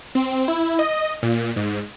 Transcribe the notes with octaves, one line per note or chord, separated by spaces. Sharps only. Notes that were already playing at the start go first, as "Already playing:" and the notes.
C4
E4
D#5
A#2
G#2